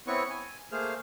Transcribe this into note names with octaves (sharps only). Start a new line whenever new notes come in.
B3 C4 E4 B4 C#5 C#6
G#5
A3 A#3 G#4 C5 F5 F6